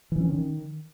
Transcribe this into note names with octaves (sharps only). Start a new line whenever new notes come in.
E3
C#4
D#3